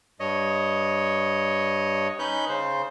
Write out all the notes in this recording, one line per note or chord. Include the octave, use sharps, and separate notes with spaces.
G2 C#5 D#5
C#4 D#4 B4 F#6 G6
C#3 C5